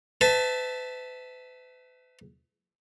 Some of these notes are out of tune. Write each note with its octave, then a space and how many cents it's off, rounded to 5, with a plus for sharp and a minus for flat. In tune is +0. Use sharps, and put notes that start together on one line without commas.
B4 +40 E5 -10 A5 +0